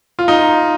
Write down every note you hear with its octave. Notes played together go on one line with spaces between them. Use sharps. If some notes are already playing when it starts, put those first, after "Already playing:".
F4
D#4